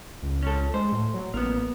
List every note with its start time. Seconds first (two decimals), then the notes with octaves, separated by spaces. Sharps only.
0.22 C#2
0.43 C#4 A4
0.74 G#3 C5
0.92 A2
1.14 F#3
1.34 A1 A#3 B3